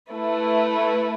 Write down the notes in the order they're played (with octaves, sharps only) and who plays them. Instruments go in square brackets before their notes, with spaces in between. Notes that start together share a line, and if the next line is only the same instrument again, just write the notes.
[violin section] A3 E4 B4